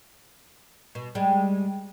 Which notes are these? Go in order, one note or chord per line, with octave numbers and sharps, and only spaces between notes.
B2
G3 G#3